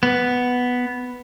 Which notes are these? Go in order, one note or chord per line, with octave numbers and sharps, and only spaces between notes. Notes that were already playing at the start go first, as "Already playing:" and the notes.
B3